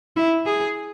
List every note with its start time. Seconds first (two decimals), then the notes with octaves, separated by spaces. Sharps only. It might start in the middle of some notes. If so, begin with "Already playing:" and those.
0.16 E4
0.46 G#4